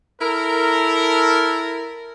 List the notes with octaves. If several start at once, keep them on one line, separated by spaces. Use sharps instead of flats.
E4 A4 A#4